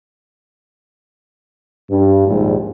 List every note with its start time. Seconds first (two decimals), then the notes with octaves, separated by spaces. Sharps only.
1.90 G2
2.28 A#1 D#2 G#2